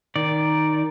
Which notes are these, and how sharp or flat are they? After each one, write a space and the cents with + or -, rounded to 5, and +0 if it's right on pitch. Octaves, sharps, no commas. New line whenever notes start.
D#3 +0 D5 +0